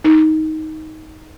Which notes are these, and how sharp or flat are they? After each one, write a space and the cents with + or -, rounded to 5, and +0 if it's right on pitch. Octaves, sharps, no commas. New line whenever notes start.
D#4 +10